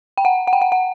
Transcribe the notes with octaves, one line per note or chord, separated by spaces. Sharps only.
G5
F#5
F#5
G5
F#5
F#5